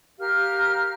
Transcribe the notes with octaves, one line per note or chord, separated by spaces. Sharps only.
G4 A#4 F5 F6